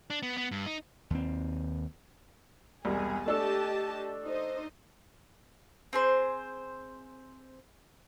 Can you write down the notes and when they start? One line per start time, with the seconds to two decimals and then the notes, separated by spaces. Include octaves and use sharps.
0.10 D4
0.23 B3
0.37 B3
0.51 G2
0.66 D#4
1.10 D#2 C4
2.85 E1 C2 G#4
3.26 A3 D4 G4 A4 D#5 A5
4.24 D#4 C5 D#5
5.93 C4 G#4 C5